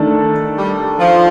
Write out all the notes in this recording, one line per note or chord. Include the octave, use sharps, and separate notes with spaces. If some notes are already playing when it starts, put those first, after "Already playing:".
Already playing: D#3 A3 D4 A4
G3
F3